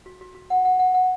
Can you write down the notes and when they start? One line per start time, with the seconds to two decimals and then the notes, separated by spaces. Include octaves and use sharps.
0.06 F#4
0.21 F#4
0.35 F#4
0.50 F#5
0.65 F#5
0.79 F#5
0.94 F#5